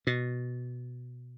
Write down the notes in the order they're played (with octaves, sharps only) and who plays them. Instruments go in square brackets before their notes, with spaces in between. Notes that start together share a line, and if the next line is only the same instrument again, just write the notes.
[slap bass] B2